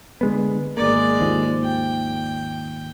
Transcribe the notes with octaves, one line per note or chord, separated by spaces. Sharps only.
D3 G#3 B3
G#1 G#3 A#3 D5
G#1 D#2 F3
G5